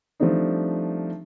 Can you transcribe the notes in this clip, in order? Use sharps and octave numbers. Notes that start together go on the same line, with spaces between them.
F3 G3 A3 C4 D4 D#4